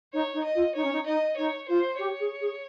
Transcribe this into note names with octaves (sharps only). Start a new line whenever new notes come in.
D#4 C#5
D#4
D#5
F4
D#4 C#5
C#4
D#4
D#4 D#5
D#4 C#5
F4 C5
G4 C#5
G#4
G#4